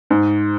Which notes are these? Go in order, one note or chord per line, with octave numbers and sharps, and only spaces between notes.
G#2